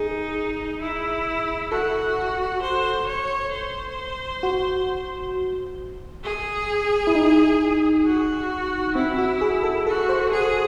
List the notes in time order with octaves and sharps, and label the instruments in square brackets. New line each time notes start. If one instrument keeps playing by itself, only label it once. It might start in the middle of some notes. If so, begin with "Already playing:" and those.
Already playing: [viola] D#4 [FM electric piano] G#4
[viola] E4
[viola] F#4 [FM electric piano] A4
[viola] C5
C#5
C5
[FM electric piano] F#4
[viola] G#4
[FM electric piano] E4
D#4
[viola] F#4
[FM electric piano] C4 [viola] E4
[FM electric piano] F#4
G#4
A4
[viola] F#4 [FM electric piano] A4
[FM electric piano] C5
[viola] G#4 [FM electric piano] A4